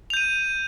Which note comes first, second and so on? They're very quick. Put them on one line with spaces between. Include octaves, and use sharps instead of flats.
F7 G6 D#7